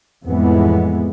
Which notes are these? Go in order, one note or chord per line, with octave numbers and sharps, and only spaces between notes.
F2 A2 E3 G#3 B3